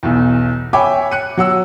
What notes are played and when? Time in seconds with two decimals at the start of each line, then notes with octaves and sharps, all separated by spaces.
0.03 B1 E2
0.73 C#5 E5 G5 G#5 B5 D6
1.11 F#6 C#7 D#7
1.37 F#3 F#5 E6